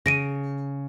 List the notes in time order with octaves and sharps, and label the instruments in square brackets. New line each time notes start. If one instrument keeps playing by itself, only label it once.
[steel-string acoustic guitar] C#3 [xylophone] A#6 D7 D#7